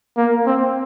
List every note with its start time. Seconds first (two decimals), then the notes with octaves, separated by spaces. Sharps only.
0.17 A#3
0.46 C4